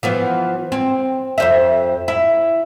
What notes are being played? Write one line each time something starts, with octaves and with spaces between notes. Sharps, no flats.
E3 F3 B3
C4
F2 C5 E5
E4